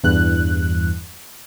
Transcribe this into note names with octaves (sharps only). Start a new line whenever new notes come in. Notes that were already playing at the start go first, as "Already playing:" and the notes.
E2 G2 F#6